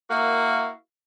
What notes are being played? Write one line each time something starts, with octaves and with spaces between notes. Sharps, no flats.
A#3 E4 F#4 A#4 F5